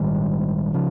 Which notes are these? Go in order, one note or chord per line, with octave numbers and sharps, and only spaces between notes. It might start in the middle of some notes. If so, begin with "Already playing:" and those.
Already playing: A#1 G#2 D#3 G3
C#3 F3